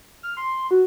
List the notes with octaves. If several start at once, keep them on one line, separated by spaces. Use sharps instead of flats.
F6
C6
F#4